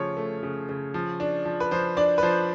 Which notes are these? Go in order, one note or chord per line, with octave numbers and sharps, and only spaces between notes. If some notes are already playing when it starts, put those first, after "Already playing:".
Already playing: C#3 F3 A3 C#5
A3
C#3
C#3
F3
D4
F3
B4
F3 C5
D4 D5
B4
F3 C5